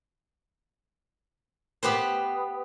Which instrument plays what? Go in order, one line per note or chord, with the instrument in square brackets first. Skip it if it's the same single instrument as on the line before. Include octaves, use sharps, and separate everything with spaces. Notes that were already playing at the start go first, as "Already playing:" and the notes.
[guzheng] B3 G4 B4 C5